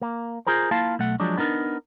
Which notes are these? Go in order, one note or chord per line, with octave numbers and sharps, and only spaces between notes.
A#3
F4 G#4 A#4 C5
A#3 E4 F4 F5 A5
B1 A3 F#5
F3 F#3 G#3 D4
B3 D4 D#4 A#4